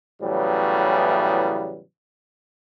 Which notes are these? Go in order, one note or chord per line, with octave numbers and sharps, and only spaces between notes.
A2 C#3 E3 F#3 G3 B3